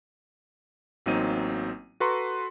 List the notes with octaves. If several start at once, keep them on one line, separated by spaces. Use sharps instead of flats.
A1 F#3 A#3 C4 D#4 D#7
F#4 A4 B4 A#5 C6 C#6